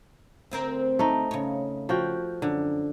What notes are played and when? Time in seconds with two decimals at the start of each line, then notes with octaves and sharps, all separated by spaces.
0.51 D2 C4 A#4
0.99 A3 D#4
1.31 C#3 C#5
1.89 F3 F#4 G5
2.42 F#2 D3